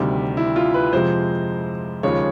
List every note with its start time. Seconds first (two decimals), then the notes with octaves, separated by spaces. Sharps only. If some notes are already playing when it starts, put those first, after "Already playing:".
Already playing: D2 C3 D#3 G3
0.37 E4
0.56 F4
0.74 B4
0.93 F2 C3 F3 G#3 C5
2.03 D#2 C#3 F3 G#3 C#5